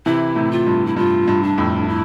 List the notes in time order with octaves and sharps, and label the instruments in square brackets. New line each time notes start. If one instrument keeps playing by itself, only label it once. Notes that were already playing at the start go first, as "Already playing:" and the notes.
[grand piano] C3 E3 [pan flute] E4
[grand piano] A2 C3
[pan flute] F4
[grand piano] G2
[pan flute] E4
[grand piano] G2 [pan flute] F4
[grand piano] G2
[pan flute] D4
[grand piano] F2 A2
[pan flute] E4